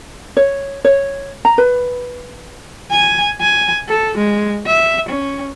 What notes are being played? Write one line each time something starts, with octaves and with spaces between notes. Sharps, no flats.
C#5
C#5
A#5
B4
G#5
G#5
A4
G#3
E5
C#4